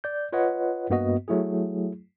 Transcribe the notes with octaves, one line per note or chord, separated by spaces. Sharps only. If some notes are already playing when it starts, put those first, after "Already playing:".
D5 G6
F4 B4 C#5 D#5 F#5
G2 A#3 B3 F#4 D#5
F#3 A3 E4 G#4